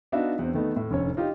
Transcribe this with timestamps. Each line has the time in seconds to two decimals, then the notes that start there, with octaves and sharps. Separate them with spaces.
0.12 B3 D4 D#4 F#4 E5 F5
0.39 E2 C4
0.54 D#3 A3 B3 D#4
0.76 A2
0.91 F1 D3 C#4 C#5
1.17 D#4 F4 G4